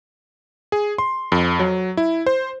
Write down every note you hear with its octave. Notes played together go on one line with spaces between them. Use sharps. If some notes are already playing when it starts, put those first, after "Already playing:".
G#4
C6
F2
F#3
E4
C5